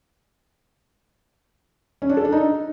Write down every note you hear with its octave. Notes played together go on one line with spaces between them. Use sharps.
C#4
D4
A4
D4
D#4